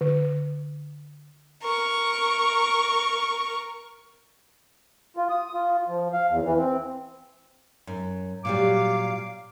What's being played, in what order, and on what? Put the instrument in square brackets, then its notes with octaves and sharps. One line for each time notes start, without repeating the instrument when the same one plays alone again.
[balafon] D3
[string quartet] A#4 C#6
[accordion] F4
D#6
F4
F3
F5
E2
E3
C4
[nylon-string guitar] F#2
[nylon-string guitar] A#2 F#3 G3 [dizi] F5 [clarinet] D6